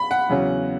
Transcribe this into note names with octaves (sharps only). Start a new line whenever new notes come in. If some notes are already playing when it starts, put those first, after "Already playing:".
Already playing: B5
F#5
E2 C#3 F#3 C#4